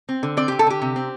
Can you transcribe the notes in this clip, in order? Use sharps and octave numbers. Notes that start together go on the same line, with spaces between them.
C4
D3
C4 D5
D3 G4
A4
D3 G4
C3
C4